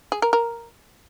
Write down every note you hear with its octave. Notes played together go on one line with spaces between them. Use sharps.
G#4
A#4
A#4